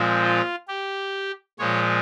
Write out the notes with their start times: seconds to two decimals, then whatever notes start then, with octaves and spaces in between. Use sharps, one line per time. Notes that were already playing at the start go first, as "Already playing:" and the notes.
Already playing: A#2 F3 G#3 C4
0.24 F4
0.68 G4
1.59 A#2 F3 G#3 C#5